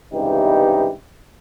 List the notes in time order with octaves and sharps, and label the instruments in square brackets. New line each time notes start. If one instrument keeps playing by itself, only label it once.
[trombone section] C#2 G2 C3 E3 D#4 G4